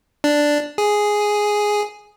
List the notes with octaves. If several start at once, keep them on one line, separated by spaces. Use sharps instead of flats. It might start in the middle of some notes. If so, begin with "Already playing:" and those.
D4
G#4